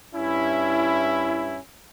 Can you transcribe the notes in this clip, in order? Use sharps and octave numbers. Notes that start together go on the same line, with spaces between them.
G2 C#4 E4